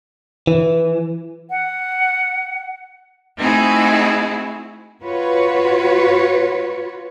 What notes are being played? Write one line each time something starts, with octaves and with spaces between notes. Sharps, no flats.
E3
F#5
A3 C4 D#4 E4 F#4 G#4
F4 F#4 B4 C#5